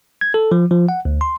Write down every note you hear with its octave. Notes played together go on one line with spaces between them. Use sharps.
G#6
A4
F3
F3
F#5
D2
C6